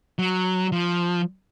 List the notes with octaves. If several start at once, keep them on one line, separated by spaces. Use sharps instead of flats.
F#3
F3